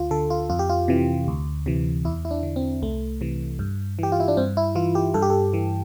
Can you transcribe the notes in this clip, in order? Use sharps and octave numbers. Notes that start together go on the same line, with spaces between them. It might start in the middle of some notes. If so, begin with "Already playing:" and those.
Already playing: D2 F4
D3 A4
F4
F2 F4
G4
F4
C3 E3
D2
C3 E3
E2 E4
E4
D4
D3
C4
C2 A3
C3 E3
G2
E3 G4
F4
E4
D4
G2 C4
E4
E3 F4
G4
G2 A4
G4
A4
E3